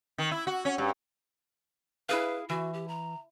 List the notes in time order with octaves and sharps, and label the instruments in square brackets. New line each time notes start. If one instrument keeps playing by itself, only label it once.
[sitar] D#3
E4
F#4
C#4
G2
[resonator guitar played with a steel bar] E4 G#4 F5 [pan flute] B4
[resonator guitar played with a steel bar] E3 [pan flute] F#4
[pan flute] G4
A#5